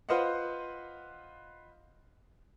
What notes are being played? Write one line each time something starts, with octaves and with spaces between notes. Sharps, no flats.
F4 B4 C5 D#5 F5 F#5